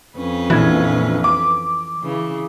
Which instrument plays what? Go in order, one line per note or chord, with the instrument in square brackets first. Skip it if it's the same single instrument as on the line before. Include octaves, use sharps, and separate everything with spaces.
[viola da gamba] F2 C#4 B4
[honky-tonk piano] A#1 G#6 [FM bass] E3
[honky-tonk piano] D6
[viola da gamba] C#3 E3